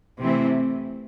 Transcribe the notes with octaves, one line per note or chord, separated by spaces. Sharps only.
C3 E3 A3 C4 E4